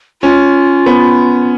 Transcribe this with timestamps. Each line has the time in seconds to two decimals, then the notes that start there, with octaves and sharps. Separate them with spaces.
0.22 C#4 F4
0.86 B3